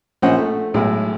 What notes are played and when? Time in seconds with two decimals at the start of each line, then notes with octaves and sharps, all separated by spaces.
0.22 A#1 C#4 C5 F#5
0.38 A3
0.74 B1 A2 G#3